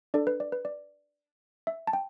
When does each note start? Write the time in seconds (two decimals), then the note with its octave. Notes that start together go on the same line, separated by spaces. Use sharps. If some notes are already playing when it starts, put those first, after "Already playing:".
0.14 D4 A4 D5
0.27 B4
0.40 D5
0.52 B4
0.65 D5
1.67 E5
1.87 A5
1.93 G5